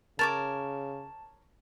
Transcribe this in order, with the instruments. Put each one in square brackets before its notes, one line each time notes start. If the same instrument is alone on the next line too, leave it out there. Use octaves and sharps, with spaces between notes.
[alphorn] C#3 [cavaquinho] A#4 C#5 D6 [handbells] A5 [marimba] A6